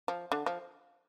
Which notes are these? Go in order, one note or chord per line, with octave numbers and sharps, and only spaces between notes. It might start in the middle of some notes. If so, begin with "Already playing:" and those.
F3
D3
F3